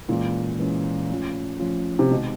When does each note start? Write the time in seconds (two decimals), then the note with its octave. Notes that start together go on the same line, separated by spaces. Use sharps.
0.09 A#2 E3 G#3 C#4
0.59 E3 G#3 C#4
1.09 F3 A3 C#4 F4
1.60 F3 A3 C#4 F4
1.99 C3
2.11 B2 D#3 G#3 C4 D#4